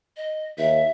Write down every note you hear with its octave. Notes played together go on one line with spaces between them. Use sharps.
D#5
D#2 E5